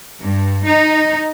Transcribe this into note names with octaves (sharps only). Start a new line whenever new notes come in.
G2
D#4